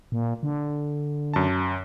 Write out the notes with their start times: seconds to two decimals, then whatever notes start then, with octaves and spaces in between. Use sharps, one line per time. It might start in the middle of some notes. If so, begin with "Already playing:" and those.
0.12 A#2
0.43 D3
1.34 F#2 A5